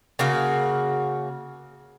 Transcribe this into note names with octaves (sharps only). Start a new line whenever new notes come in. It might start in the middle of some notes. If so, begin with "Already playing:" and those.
C#3 A#3 F#4